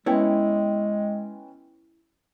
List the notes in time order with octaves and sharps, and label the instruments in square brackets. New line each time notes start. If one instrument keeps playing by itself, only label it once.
[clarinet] G#3 [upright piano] B3 C#4 G5 [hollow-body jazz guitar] E4 C#5